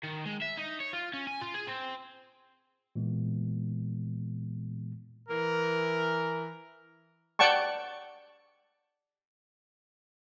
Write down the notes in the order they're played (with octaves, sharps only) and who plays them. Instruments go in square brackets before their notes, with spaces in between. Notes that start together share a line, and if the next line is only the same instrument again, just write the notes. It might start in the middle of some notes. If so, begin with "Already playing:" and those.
[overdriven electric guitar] D#3
G#3
E5
D#4
C#5
F4
C#4
G#5
F4
G#4
C4
[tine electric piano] A#2 E3 G#3 B3
[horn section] E3 A#4
[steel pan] D5 F#5 G5 A5 C#6